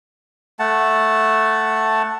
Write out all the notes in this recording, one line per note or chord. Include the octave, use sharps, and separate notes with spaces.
A3 F#5 A5